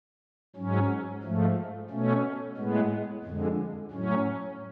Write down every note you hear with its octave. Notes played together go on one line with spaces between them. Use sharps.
G#2 F#3 C#4
G#2 F3 A3
B2 A3 C#4
A2 G#3 B3
F2 D3 G#3
A2 F#3 C#4